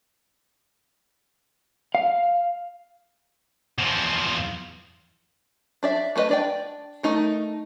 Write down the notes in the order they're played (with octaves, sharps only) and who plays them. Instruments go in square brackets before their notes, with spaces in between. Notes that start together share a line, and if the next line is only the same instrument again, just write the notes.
[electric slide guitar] F5
[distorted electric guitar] E2 F3
[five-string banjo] D4 D5 E5
A3 A#4 B4 D#5
D4 D5 G5
A3 D#4 A#4